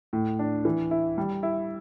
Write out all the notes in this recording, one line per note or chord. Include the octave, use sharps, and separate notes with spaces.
A2
D4
E3
E4
G3
E4